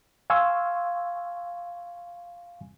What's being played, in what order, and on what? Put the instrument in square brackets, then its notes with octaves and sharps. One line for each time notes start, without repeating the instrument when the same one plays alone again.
[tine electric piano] F5 G#5 C6 C#6 E6